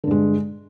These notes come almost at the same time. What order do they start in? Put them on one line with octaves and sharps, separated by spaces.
D3 G2 G#3